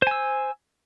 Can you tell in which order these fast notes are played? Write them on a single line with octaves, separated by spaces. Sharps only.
C5 G#5 E6